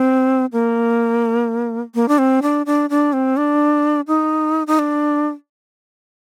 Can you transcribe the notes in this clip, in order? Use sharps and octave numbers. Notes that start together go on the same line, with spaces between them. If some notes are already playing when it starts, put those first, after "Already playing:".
Already playing: C4
A#3
A#3
D4
C4
D4
D4
D4
C4
D4
D#4
D#4
D4